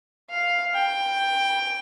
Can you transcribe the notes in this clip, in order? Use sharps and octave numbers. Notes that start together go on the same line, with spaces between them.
F5
G5